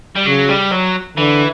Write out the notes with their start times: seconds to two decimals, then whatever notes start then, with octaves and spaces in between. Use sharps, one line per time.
0.16 G3
0.27 C#3 F#3
0.50 G3
0.72 F#3
1.17 D3 E3